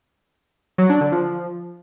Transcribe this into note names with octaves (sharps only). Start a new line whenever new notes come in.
F#3
D4
D3
F3